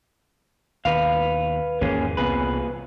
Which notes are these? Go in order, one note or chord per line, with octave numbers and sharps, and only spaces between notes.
D#2 B2 B4 F5
G#1 E2 E3 A#3 C#4 G#4
C2 A#2 B3 C4 G#4 B4